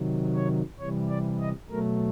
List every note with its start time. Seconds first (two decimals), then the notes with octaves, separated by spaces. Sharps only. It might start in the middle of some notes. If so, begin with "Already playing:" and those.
Already playing: C3 D#3 F#3
0.35 C#5
0.80 C3 E3 G3 C#5
1.10 D5
1.40 D#5
1.70 B2 F#3 A3 A#4